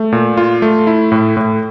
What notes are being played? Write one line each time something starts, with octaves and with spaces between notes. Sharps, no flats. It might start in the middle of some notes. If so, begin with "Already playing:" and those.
Already playing: A3
A#2
F4
A3
E4
A2
A2